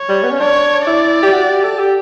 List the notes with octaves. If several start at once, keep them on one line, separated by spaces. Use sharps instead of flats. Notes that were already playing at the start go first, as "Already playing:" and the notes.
Already playing: C#5
G3
B3
C#4
D4 C#5
E4 D5
G4
F#4
G4
A4
G4